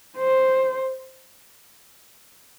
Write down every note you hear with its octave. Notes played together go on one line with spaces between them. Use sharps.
C5